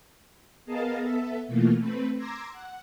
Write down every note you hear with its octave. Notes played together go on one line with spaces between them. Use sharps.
B3 G#4 A#4 D#5 F5 A5
B3 A4 E5
B2 E3 A3 A#3 F4
A3 C4 B4
A#5 C6 D6 E6 G#6 A#6
F#5